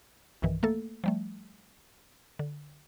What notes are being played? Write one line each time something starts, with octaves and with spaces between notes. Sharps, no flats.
B1 G2 D#3 E3
A3 A#3 A4
F3 G3 A3
D3